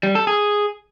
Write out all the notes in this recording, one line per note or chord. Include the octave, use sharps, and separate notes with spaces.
G3
A4
G#4